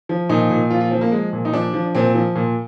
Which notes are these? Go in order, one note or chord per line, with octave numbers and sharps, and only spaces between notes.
F3
A#2 D#4
A#2
F3 F4
F4
F3 C4
A#3
F3 G#3
A#2
D#4
F3 D4
F3
A#2 C4
F3
A#2